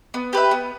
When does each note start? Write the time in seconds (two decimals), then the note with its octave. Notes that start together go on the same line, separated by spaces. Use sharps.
0.14 B3
0.33 G4 B4 E5
0.51 B3